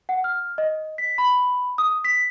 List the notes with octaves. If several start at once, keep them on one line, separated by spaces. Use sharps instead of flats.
F#5
F6
D#5
B6
B5
D#6
B6